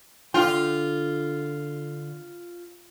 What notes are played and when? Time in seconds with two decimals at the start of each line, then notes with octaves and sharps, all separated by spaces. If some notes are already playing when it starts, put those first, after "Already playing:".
0.34 D3 F4 G5